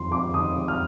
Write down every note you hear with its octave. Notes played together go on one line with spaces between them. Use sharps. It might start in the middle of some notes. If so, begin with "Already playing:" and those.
Already playing: F2 D#3 C6
F2 D6
D#3 D#6
F2
F6